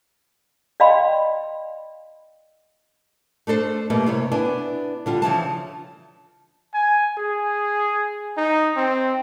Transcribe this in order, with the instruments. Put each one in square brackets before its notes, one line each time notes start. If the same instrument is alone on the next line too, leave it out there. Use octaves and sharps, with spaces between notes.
[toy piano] D5 D#5 F5 G5 B5 C6
[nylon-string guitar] A3 D4 A4 C5
B2 G3 A3 A#3
C3 E4 C#5
B3 D4 E4 G#5
D3 G3 F4
C#3 E3 F3 A5
[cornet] G#5
G#4
D#4
C4